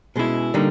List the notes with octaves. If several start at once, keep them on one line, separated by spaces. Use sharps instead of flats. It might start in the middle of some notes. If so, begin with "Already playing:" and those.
B2 G#3 C#4 E4
D3 G3 A#3 D#4